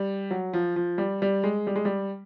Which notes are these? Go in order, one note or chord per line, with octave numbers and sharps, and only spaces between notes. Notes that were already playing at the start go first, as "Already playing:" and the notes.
Already playing: G3
F#3
F3
F3
G3
G3
G#3
G3
G#3
G3